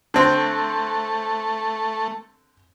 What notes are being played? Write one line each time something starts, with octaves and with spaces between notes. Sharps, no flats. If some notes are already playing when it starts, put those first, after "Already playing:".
D3 A3 C4